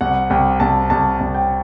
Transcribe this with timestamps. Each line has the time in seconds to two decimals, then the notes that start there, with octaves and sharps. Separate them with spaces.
0.01 C2 F#5
0.30 C2 G5
0.60 C2 A5
0.90 C2 A5
1.20 C2
1.34 G5